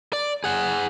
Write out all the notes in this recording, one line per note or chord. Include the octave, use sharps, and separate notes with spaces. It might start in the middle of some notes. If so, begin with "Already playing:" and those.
D5
G#4 F#5